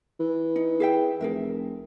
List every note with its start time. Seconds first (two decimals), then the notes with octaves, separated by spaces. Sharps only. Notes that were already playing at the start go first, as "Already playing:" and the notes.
0.19 E3
0.56 D#4
0.80 G#4 E5 G5
1.21 F1 G#4 A#4 E5